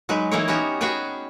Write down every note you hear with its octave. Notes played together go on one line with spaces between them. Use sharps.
F#3 G#3 D#4 B4
E3 A#3 D#4 E4 A#4 C#5
B3 C#4 D#4 F#4 G4 A#4
F#4 G#4 B4 C#5 G5 G#5